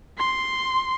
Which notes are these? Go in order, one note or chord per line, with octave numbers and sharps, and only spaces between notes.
C6